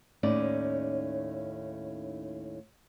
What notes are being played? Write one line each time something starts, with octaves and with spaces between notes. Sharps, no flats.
D#2 A2 C#4 D#4 D5